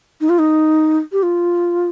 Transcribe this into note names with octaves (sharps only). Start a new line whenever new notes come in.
D#4
F4
D#4
G4
F4